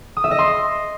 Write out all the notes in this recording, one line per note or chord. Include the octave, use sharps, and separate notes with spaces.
D#6
E5
D#5
C6